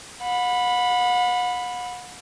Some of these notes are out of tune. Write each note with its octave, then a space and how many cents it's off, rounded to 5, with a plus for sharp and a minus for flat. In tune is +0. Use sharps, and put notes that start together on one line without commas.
F#5 -40 B5 +0